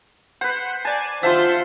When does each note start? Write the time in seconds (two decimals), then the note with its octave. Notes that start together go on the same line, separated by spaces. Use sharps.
0.41 B4 C5 F#5
0.85 D5 G#5 A5
1.23 F4 C5 E5 F#5 A5 C6